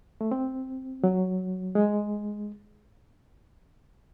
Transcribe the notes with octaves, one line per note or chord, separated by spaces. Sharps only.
A3
C4
F#3
G#3